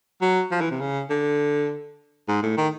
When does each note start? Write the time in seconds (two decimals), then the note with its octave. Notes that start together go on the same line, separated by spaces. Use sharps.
0.21 F#3
0.51 F3
0.61 E3
0.71 C3
0.80 C#3
1.10 D3
2.28 G#2
2.42 A2
2.57 D#3